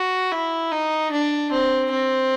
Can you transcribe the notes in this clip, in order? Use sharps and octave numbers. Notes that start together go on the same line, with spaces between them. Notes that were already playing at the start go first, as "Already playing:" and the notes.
Already playing: F#4
E4
D#4
D4
C4
C4